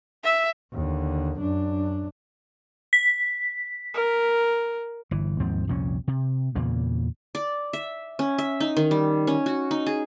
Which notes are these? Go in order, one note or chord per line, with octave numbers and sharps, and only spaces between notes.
E5
D#2 D3
F#2 D4
B6
A#4
G1 E3
D#2 G#2 F3 C4
C2 F2 A#2 C#4
C3
E2 A#2 C#3 A#3
D5
E5
C#4
E5
D#4
D#3
G3
C#4
F#4
D#4
G#4